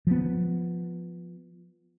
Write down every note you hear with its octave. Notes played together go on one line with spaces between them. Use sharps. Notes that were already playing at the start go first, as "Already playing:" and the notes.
F3 B3